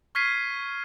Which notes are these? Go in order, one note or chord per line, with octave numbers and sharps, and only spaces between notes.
C#6 F6 G#6 B6 C7 D#7